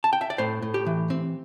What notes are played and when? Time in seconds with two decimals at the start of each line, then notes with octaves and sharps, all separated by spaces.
0.04 A5
0.13 G5
0.21 E5
0.30 D5
0.38 A2 C5
0.62 A2
0.74 G4
0.86 E3
1.10 C4